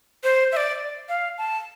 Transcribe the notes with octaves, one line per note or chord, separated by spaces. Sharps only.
C5
E5
D5
F5
A5